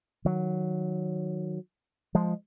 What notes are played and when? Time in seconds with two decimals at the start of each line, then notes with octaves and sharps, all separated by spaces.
0.25 D#3 F#3
2.15 F3 G#3